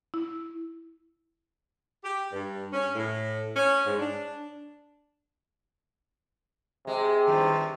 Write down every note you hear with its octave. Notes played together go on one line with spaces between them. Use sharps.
E4
G4
G2
C#4
A2
C#4
G#2
D4
C3 G#3
G2 D#3 F3